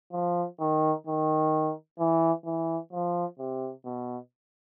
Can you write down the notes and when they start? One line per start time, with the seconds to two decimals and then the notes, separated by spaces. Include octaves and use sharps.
0.13 F3
0.60 D#3
1.07 D#3
1.99 E3
2.45 E3
2.93 F3
3.39 C3
3.85 B2